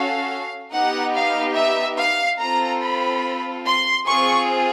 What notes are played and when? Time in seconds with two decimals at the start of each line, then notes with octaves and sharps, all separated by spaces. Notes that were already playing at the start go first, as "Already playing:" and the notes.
Already playing: C#4 F#4 A4 F5
0.73 B3 D#4 G4 F#5
1.16 F5
1.57 E5
1.98 F5
2.40 C4 F4 A4 A#5
2.82 B5
3.65 C6
4.07 C4 F4 G#4 C#6